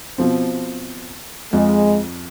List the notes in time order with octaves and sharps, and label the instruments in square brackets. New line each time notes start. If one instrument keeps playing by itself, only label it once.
[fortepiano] B2 F3 C4
[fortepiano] F2 [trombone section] G#3